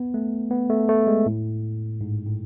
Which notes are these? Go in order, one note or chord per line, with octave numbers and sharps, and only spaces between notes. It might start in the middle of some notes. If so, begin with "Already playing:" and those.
Already playing: B3
A3
B3
A3
A3
G#3
A2
G#2
A2